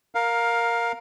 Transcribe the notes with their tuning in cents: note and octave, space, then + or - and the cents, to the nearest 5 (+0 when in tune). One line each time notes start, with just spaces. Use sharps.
A#4 +0 F5 +15